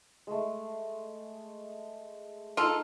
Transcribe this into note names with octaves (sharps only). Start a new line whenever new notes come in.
G#3 A3
D#4 F4 A4